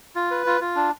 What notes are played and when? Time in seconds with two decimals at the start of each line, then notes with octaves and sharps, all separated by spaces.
0.16 F4
0.31 B4
0.46 F4
0.61 F4
0.76 D4